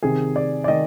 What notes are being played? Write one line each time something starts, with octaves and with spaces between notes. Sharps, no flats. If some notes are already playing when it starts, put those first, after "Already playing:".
C3 D#3 G#4
D5
D5
D#3 D#5